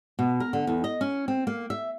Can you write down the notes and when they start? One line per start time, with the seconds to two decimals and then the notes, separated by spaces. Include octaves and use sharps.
0.19 B2
0.40 A#4
0.53 D3
0.67 E2
0.84 D#5
1.01 C#4
1.28 C4
1.47 A#3
1.70 E5